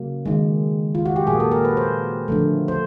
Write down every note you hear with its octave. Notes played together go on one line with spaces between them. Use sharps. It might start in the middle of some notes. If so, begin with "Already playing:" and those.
Already playing: C#3 F#3 A#3
D#3 G#3
F4
F#4
G4
A#2 F#3 A#3 G#4
A4
A#4
B4
C5
D3 F3 A3
C5